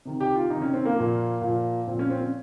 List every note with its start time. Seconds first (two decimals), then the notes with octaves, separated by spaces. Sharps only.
0.05 C3 D#3
0.20 G4
0.35 F4
0.50 C3 D#3 D#4
0.62 C#4
0.74 C4
0.85 A#3
0.96 A#2 F3
1.42 A#2 F3
1.87 A#2 F3 C4
1.99 C#4
2.10 C4
2.21 C#4